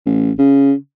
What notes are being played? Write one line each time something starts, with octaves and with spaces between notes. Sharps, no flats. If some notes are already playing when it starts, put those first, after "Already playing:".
A1
C#3